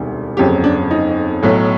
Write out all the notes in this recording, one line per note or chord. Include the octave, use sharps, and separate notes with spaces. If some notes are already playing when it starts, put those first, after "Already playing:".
Already playing: E1 D2 C3 D#3 G3
G1 F2 C#3 F#3 G4
D4
D#4
B1 A2 F#3